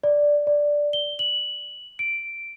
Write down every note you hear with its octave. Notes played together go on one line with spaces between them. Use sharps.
D5
D5
G7
F#7
D7